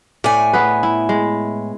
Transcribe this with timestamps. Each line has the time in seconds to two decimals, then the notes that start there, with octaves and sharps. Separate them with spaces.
0.24 A2 A3 D5 G#5
0.53 B3 G#4 B4
0.83 E4
1.09 G#3